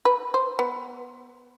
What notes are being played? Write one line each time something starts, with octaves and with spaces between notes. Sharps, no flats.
B4
C5
B3